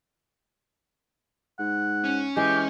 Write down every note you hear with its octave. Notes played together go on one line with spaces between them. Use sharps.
G#2 F#5
C#4
E3 G#3 G4